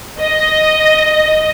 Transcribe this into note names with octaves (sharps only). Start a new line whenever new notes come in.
D#5